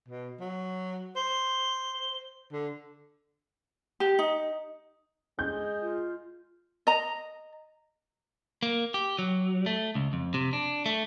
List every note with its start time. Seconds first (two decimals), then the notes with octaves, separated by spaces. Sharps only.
0.08 B2
0.40 F#3
1.16 C5
2.52 D3
4.00 G4
4.19 D#4
5.39 G#3 G6
5.81 F4
6.87 D#5 A#5
8.63 A#3
8.94 G4
9.19 F#3
9.66 A3
9.95 C#2
10.13 F2
10.34 C3
10.53 D4
10.86 A3